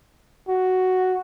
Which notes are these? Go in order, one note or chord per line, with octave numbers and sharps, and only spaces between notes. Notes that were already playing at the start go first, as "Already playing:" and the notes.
F#4